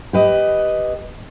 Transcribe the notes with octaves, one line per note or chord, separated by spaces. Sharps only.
G4 B4 D#5